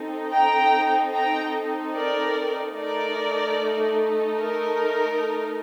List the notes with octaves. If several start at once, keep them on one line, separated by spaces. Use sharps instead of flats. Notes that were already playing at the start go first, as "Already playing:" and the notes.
Already playing: C4 D#4 A4
G5 A#5
G5 A#5
A#4 D5
A3 D#4 A4 A#4 D5
A#4